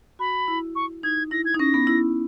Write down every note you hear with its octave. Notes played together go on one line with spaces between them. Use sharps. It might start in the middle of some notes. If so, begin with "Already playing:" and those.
F#4 B5
E4
C#6
D#4 G#6
E4 A#6
G#6
D#4
C#4 A#6
B3
E4